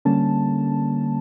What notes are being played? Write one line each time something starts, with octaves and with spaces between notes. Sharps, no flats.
D3 G3 A#3 C#4 A5